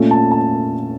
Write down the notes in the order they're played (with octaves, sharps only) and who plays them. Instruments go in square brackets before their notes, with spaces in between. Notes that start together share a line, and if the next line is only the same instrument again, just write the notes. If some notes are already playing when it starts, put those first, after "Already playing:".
Already playing: [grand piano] A#2 A3 C#4 F4
A5
A5